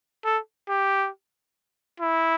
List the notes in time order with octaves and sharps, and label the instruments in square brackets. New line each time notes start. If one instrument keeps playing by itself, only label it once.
[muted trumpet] A4
G4
E4